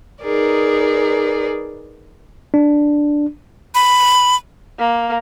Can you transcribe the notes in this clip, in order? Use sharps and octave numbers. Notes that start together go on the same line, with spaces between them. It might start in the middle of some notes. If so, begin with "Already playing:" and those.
D#4 G#4 A#4 B4 D5
D4
B5
A#3